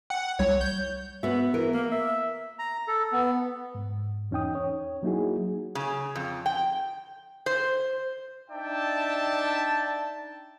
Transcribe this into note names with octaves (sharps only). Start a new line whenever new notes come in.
F#5 G5
C2 G3 C#5
G6
B3 F#4 E5
E3 A#4
A#3
E5
A#5
A4
B3
G#2
E2 C#4 D#4 G5 D#6
C#5
F#3 A#3 D#4 E4 F#4 G#4
C#3
F2
G5
C5
D4 D#4 D5 E5 G5 A5